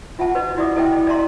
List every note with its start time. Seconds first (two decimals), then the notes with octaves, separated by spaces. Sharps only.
0.19 F4 E5 F#5 A5
0.34 F#4 B4 D#5
0.57 E4 F#4 D5 E5 D6 D#6
0.76 E4 A4 D#5 E5 G5
0.92 D#5
1.07 D5 E5 A5 A#5 C6